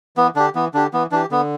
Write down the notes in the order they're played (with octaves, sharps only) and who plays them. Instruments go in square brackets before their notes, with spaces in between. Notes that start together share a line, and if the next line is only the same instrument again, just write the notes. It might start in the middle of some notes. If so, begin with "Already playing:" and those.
[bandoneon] E3 [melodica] B3
[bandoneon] D3 [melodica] D4 G4
[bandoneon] E3 [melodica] B3
[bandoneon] D3 [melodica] D4 G4
[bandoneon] E3 [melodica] B3
[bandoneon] E3 [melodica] D4 G4
[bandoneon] D3 [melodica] B3